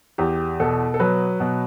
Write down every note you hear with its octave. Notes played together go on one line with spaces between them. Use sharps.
E2 G4
B2 A4
A4
F#3 B4
B2